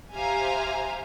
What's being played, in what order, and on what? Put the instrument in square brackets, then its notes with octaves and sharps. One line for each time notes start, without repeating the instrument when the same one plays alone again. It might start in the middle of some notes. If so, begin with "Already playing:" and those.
[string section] G4 C5 E5 F5 G#5 A#5